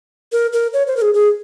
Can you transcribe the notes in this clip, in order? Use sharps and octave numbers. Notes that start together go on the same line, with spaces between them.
A#4
A#4
C#5
C5
A#4
G#4
G#4